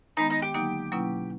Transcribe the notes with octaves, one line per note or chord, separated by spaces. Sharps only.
D#3 G#3 B3 D#4
D#4
G4
D3 F#3 A#3 D#4
B2 F#3 A#3 C#4 E4